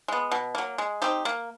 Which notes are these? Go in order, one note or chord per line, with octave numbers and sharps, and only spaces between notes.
G#3 B3
B2
F#3 A#3
G#3
C4 D#4 G4
A#3